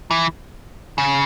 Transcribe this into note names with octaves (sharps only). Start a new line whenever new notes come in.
E3
C#3